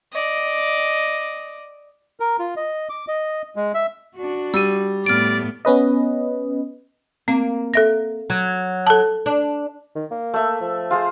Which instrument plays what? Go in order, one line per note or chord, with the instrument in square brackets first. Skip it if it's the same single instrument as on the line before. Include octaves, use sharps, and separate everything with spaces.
[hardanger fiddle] D5 D#5
[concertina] A#4
F4
D#5
D6
D#5
G#3
E5
[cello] D4 F#4
[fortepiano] G3 [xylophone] E6 D#7
[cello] A2 B3 [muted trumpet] D5 [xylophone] F6 D7
[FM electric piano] B3 C#4 B4 D#5
[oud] A#3 [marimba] C4
[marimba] A4 E5 A#6
[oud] F#3
[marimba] A4 A5
[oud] D4
[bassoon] D#3
A#3
[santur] A3 E5
[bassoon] F3
[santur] F4 G#4 C5